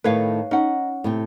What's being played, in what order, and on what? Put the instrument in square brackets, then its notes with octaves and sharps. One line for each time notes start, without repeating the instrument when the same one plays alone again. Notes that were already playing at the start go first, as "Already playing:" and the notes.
[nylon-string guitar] A2 D#3 A3 [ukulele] B4 C#5 F5
[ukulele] C#4 F#5 [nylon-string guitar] D#4
[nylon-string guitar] A2 C3 G5